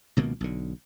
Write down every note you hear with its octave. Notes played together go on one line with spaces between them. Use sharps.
C#2 B2 D#3 A#3
B1 D3